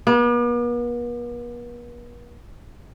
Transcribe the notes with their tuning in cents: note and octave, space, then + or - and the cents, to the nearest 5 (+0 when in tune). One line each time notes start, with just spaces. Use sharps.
B3 -45